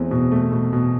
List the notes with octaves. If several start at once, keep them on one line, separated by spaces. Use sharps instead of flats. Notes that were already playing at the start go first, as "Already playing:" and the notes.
Already playing: E2 A3 C4
B2
A3
B2
B2